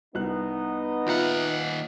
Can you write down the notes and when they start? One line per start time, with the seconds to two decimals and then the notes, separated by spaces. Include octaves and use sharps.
0.15 C2 B3 D#4 D#5 F#6
1.07 D#2 F4 E5 F#5 A#5